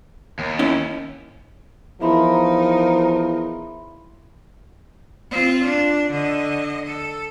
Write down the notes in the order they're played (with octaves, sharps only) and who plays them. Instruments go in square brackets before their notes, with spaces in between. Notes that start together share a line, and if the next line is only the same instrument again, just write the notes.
[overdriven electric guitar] D#2
[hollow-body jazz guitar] C#4 E4
[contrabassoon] E2 [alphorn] F3 [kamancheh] D#4 A#4 [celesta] E5 B5 C6
[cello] C4 F4
D4
D3 D#5
A4